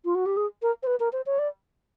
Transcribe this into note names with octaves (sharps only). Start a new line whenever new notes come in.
F4
F#4
G4
G#4
A#4
C5
B4
A#4
C5
C#5
D5